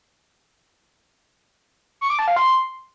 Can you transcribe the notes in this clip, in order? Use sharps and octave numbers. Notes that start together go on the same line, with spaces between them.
C#6
D6
A5
F5
C6